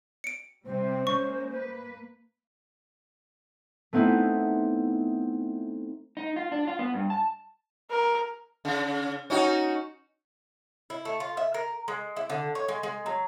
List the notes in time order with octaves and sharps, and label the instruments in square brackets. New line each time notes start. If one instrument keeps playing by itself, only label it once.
[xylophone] C#7 D7
[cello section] C3 G3 C4 [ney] C5
[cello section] G#3 A#3 C#4 [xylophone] C#6
[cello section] A#3 B4
[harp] A3 B3 C4 D#4 E4
[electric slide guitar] D#4
F4
D4
F4
B3
G2
A5
[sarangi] A#4
[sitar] C#3
C#4 D#4 F#4
[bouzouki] E4
A3
F4
E5
A#4
G#3
E4
D3
C#5
G#3
G#3
F#3